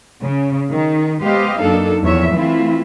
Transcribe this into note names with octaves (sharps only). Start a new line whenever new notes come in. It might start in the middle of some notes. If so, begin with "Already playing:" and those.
C#3
D#3
G#3 B3 G4 C5 D#5 F5
F#2 A#3 D4 D#4 A4
E2 F3 C#5 E5
E3 A3 C4 E4 F4